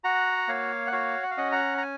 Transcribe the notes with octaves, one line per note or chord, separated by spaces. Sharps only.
F#4 F#5 A#5
A#3 C#5 F5
F#5
F#4 C#5 F5
F#5
F5
C#4 D#5 F#5
F#5 A#5
A#5
G#5